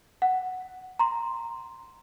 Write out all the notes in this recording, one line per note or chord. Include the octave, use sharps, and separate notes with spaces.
F#5
A#5 C6